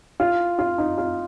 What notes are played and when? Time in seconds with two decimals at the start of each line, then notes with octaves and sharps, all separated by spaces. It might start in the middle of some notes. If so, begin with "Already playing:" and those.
0.20 F4
0.59 F4
0.78 D#4
0.98 F4